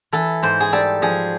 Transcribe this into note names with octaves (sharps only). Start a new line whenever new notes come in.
E3 A4
G#2 C5
G#4
G3 A4
F3 G#4